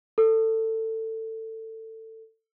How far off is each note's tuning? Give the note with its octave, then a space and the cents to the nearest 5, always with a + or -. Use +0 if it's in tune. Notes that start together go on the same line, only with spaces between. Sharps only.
A4 +20